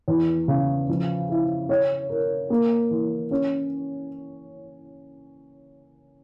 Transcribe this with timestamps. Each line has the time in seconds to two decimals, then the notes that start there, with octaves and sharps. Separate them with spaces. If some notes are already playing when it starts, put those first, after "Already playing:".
0.08 E2
0.48 C#3
0.89 F3
1.29 E4
1.69 C#5
2.10 A#4
2.50 A#3
2.91 E3
3.31 C#4